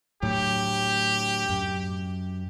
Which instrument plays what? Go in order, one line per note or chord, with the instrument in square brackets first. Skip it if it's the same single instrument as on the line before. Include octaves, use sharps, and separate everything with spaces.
[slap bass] D2 A2 F#3 [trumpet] G4
[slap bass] F#2